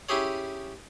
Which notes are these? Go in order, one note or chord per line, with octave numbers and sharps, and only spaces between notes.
C#4 E4 G4 G#4 C#5